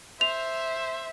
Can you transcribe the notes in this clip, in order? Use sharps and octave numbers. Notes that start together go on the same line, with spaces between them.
C5 E5 F7